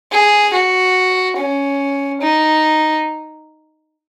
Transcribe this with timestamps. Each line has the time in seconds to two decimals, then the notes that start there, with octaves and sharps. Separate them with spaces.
0.12 G#4
0.53 F#4
1.37 C#4
2.21 D#4